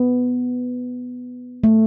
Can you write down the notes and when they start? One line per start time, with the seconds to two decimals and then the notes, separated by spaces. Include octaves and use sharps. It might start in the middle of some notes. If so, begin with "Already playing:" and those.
Already playing: B3
1.64 A3